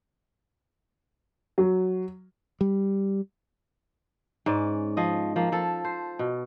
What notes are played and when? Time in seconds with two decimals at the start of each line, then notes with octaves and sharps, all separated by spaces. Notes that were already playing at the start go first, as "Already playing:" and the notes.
1.58 F#3
2.61 G3
4.46 G#2 C#4 D5
4.97 F3 D#5
5.36 F3 A#3
5.52 F3 A4
5.85 C5
6.19 B2